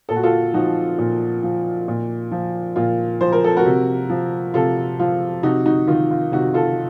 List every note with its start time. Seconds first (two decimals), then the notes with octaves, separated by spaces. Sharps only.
0.09 A#2 A4
0.16 F#4
0.23 F4 A4
0.54 F3 D#4 F#4
0.98 A#2
1.43 F3
1.88 A#2
2.32 F3
2.76 A#2 F4
3.21 F3 C5
3.32 A#4
3.44 A4
3.57 F#4 A#4
3.66 C3
4.10 F3
4.54 C3 F4 A4
4.99 F3 F4
5.43 C3 D#4 F#4
5.66 D#4 F#4
5.87 D#3 F4
6.11 F4
6.32 C3 D#4 F#4
6.54 F4 A4